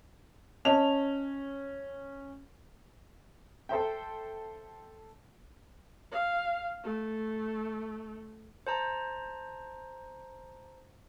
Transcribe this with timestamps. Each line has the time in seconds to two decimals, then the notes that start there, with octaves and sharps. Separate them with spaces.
0.65 C#4 D#5 A5 F7
3.69 A4 C5 E5 G5
6.12 F5
6.84 A3
8.67 C5 A5 A#5